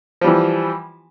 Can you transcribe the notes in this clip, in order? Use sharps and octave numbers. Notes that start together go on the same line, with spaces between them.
E3 F3 G3